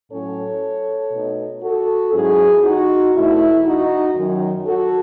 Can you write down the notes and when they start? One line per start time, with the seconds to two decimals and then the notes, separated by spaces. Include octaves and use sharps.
0.11 A2 F#3 C#4 A4 C#5
1.12 B2 A3 D#4
1.63 F#4 A4
2.13 G#2 F#3 C#4 E4 G#4
2.63 D#4 F#4
3.14 E2 B2 A3 E4
3.65 D#4 F#4
4.15 F#2 D#3 F#3
4.66 F#4 A4